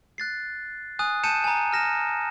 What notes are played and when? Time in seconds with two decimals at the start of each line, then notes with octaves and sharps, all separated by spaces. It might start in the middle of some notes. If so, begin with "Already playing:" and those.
0.18 F#6 A6 C7
0.99 G#5 D#6 F#6
1.24 A5 G6 C#7 D#7 E7
1.44 G#5 A#5
1.73 F6 A#6 E7